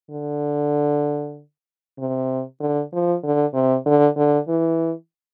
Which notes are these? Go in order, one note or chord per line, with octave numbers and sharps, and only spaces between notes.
D3
C3
D3
F3
D3
C3
D3
D3
E3